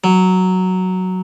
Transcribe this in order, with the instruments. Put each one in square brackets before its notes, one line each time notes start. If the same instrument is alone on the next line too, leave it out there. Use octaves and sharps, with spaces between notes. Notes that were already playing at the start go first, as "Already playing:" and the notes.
[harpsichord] F#3